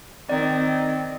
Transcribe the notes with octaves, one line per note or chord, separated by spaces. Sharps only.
D#3 C4 D5